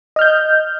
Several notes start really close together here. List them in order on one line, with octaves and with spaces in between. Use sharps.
D#5 F6 G6